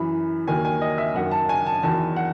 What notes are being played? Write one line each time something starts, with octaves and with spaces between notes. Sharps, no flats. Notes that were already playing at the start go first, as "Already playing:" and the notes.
Already playing: F#2 E3 B5
D#2 D#3 F#3 G#5
G#5
D#5
E5
F#2 D#3 F#3 F#5
A5
G#5
A5
E2 D#3 F#3 A5
F#5